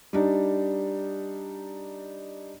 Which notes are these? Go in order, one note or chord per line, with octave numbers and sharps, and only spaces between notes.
G3 D4 D#4